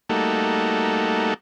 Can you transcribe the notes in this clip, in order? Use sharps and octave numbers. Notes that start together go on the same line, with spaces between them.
G3 A3 A#3 D#4 F#4 A4